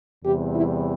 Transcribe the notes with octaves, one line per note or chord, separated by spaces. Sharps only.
E2 C3 E3 G3 G4
E4